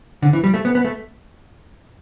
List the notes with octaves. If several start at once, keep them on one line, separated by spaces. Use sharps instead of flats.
D3
E3
G3
A3
B3
B3
A3